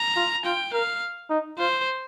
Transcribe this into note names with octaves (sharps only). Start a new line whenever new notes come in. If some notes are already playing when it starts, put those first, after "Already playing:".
Already playing: A#5
F4
F4 G5
A#4 F5
D#4
F4 C5